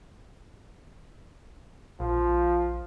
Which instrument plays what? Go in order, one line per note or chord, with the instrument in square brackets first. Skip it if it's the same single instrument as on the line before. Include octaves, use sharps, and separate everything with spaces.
[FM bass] A#1 [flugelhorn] F3